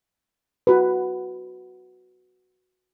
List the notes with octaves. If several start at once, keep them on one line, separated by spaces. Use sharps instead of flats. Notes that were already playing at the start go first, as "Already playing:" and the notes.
F#4 B4